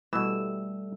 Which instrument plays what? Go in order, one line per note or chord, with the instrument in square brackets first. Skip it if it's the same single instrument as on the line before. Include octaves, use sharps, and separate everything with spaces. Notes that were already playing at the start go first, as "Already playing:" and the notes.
[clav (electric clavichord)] B2 E3 [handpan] G3 A3 [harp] E6